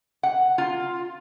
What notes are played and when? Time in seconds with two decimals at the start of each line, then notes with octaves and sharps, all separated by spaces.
0.23 F#5
0.58 F4